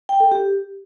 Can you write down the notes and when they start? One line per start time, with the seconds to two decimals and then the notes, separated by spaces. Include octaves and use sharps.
0.09 G5
0.20 A4
0.31 G4